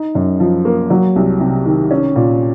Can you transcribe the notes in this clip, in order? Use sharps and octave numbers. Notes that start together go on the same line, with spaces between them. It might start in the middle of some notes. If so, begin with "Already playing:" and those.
Already playing: D#4
F#2
F3
A#3
F#3
C2
C3
D#3
C#4
A#2